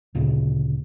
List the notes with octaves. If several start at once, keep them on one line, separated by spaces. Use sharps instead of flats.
D2 A#2 C#3